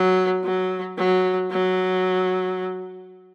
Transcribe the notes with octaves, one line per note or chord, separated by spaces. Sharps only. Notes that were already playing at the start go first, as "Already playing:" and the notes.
Already playing: F#3
F#3
F#3
F#3